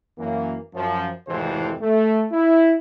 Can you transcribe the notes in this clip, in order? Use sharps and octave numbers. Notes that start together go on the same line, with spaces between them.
F#2 E3 A#3
F#2 F3
G#1 F2 A2 C3 E3 C5
A3
E4